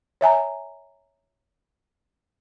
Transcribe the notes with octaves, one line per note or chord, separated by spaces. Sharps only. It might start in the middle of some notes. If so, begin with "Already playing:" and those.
C#5 E5 G#5 A#5